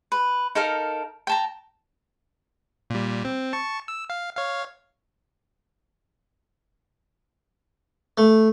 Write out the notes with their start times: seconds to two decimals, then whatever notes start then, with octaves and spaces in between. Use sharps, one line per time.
0.12 B4
0.55 D#4 A4 A#4 F5
1.27 G5 A5 A#5
2.90 A#2 G3
3.25 C4
3.53 A5 C#6
3.88 E6
4.10 F5
4.36 C#5 F5
8.17 A3